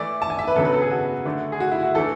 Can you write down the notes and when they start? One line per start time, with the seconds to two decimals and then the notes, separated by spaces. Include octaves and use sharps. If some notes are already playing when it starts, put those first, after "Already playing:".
Already playing: E3 A3 E4 D5
0.22 A5
0.30 G#5
0.39 E5
0.47 B4
0.56 C#3 F#3 B3 D4 A4
0.65 B4
0.74 A4
0.82 G#4
0.91 F#4
1.25 D3 A3 D4
1.52 G#4
1.60 F#4
1.72 E4
1.83 F#4
1.94 E3 A3 D4 A4